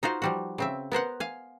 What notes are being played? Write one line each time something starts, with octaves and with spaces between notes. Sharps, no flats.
D#4 F4 F#4 C5
F3 G3 F#4
C#3 C4 E5
B3 A#4 C5 F#5
F5 G#5